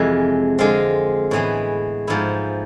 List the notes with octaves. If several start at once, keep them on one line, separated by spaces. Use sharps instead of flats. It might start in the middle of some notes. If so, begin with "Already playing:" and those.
Already playing: F2 C3 E3 G#3
D3 G#3 C4 F4
A2 E3 G#3 B3
G#2 F3 B3 E4